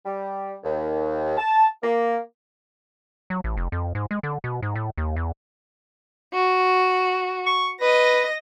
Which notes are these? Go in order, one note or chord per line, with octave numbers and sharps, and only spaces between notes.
G3
D#2
A5
A#3
F#3
A1
F1
F2
G#2
G#3
D3
B2
G#2
A2
D#2
E2
F#4
C#6
B4 D#5 A#6